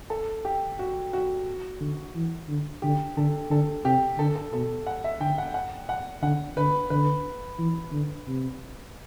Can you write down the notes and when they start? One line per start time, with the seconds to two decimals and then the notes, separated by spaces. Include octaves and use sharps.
0.10 A4
0.45 G4
0.79 F#4
1.13 F#4
1.80 D3
2.15 E3
2.49 D3
2.82 D3 G4
3.17 D3 A4
3.50 D3 A4
3.85 C3 G4
4.18 D3 A4
4.36 A4
4.53 B2 A4
4.87 F#5
5.04 E5
5.20 D3 G5
5.38 F#5
5.54 F#5
5.89 F#5
6.22 D3 F#5
6.57 D3 B4
6.90 D3 B4
7.59 E3
7.92 D3
8.27 C3